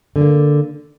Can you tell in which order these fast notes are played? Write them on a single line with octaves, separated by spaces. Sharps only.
D3 D4 A#3